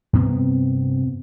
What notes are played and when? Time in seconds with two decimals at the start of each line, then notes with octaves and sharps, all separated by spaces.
0.13 G2 C3 B3 C4